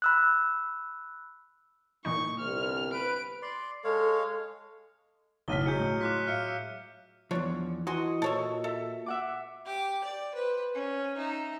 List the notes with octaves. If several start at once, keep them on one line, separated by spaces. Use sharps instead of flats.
B5 E6 F#6
A#2 E3 D#4 C#6
G1 C2 F6
B4 D7
D5 C6
G#3 A4 C#5 F5
F#1 B1 A2 F6 B6 D#7 G7
F#3 G#3 G#4 G6 C#7
A2
F4 D6 F#6 B6
E5 F5 F6 C#7
E2 G2 F3 D4 C#5
E3 F#4 D#5 G#5 C6
A#2 A4 C#5 E5
A4 E5
E5 F#5 D6
G4 D6
D5
B4 C5
C#4
D#4 E5